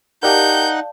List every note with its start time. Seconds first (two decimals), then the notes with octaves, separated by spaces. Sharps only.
0.23 D#4 G4 A#4 D5 F5 F#5 A5 G6